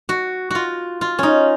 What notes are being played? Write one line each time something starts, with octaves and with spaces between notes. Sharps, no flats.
F#4
F4 F#4
F4
C#4 D#4